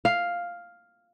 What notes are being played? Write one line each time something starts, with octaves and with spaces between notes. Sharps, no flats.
F5